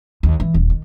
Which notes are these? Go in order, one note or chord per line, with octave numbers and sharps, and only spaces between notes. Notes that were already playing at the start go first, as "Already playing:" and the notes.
D#2
E3
D#1
D#3